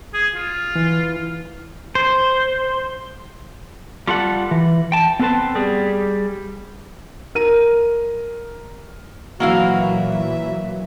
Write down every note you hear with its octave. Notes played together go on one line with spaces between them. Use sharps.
G#4
F4
E3
C5
G3 F4 A4 F#5
E3
G5 A5
B3 C4 A4 B4 C5 A5
G3 G#4
A#4 D#7
A#2 E3 F#3 A#3 E4 F#4 F5
E5